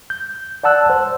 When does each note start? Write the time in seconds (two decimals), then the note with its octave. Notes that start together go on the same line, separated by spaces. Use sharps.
0.10 G6
0.64 D5 F#5 A5 E6 F#6
0.90 C5